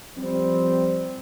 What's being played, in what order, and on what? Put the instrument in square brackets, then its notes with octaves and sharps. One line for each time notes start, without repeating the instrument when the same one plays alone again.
[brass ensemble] F3 G3 C4